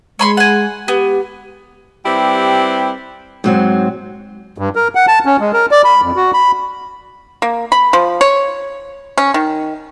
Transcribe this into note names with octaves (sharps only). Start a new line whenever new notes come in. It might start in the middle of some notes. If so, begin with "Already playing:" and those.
G#3 C#5 B5 C6
F#5 G#5
B3 G4
G3 C4 E4 G4 B4
G#2 F#3 C4
G2
A#4
F#5
A5
C#4
G#3
A#4
D5
B5
F2
F#4
B5
A#3
B5
F3
C#5
C#4
D#3